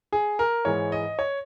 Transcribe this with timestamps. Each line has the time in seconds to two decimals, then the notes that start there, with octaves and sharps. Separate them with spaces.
0.12 G#4
0.39 A#4
0.65 G#2 E3 G#3 C#5
0.92 D#5
1.19 C#5